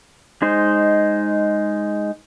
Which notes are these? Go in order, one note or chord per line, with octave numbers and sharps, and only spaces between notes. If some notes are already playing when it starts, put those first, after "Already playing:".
G#3 D#4 C5